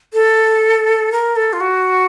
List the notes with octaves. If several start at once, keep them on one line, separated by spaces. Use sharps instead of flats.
A4
A#4
A4
F4
F#4